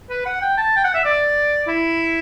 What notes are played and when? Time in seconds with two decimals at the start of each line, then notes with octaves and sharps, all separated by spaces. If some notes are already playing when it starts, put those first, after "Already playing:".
0.10 B4
0.26 F#5
0.42 G5
0.57 A5
0.76 G5
0.84 F#5
0.94 E5
1.05 D5
1.68 E4